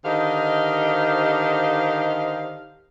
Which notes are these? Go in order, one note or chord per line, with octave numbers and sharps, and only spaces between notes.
D3 D#3 G4 C5 D#5 F5